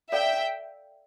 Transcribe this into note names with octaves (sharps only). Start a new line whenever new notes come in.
A4 D5 E5 F5 G5 A#5